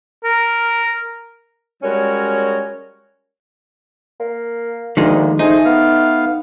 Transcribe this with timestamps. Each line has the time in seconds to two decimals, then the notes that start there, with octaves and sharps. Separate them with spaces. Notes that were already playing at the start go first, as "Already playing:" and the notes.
0.24 A#4
1.83 G3 G#3 C#4 F#4 A#4 C#5
4.20 A#3
4.97 D2 D#3 F3 G#3 A#3
5.39 A3 D#4 G#4 C5
5.65 B3 F5